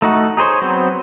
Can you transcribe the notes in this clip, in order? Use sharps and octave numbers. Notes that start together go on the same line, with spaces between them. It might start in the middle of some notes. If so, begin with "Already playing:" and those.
A3 D#4 F#4
D#4 G#4 C5 C#5
F#3 B3 C4 C5